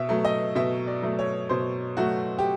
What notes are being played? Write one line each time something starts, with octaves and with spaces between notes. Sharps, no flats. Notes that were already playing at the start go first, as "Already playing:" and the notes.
Already playing: B2 E5
F#3 A3
D#5
B2 E5
D5
F#3 A3
C#5
B2 C5
F#3 A3 F#4
G4